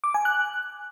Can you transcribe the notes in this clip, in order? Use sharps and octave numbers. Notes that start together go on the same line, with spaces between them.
D6
G#5
F#6